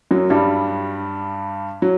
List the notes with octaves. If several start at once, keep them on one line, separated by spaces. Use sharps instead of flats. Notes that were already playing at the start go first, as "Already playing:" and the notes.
F#2 F#3
G2 G3
F#3